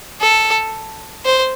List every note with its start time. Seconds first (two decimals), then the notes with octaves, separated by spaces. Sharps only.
0.21 A4
1.25 C5